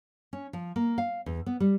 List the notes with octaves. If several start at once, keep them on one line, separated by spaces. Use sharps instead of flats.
C#4
F3
A#3
F5
E2
B3
G3